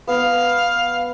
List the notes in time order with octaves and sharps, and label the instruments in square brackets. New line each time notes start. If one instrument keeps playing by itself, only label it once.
[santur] B3 [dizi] F5